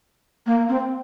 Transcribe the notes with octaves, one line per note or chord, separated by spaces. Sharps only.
A#3
C4